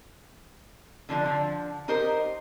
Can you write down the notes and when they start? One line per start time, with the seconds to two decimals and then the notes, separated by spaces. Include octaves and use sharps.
1.09 D3 F3 D4
1.26 D3 F3
1.88 D#4 G4 A#4 C5 D#5